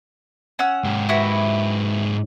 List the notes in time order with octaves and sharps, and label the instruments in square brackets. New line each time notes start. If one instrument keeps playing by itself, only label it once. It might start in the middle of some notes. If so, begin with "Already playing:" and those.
[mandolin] C#4 F#5 E6
[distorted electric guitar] G#2 G4
[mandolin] E4 F#4 B4